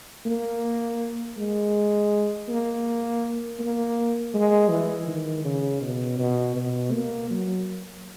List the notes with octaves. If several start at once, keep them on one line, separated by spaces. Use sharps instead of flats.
A#3
G#3
A#3
A#3
G#3
E3
D#3
C#3
B2
B2
B2
A#3
F#3